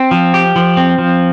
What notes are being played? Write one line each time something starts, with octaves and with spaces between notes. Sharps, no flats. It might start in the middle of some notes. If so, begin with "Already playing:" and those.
Already playing: C4
F3
G4
F3
C4
F3